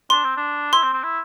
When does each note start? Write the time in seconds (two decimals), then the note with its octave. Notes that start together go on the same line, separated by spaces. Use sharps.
0.10 D4 C6
0.24 C4
0.37 D4
0.73 E4 C6
0.83 C4
0.94 C4
1.03 E4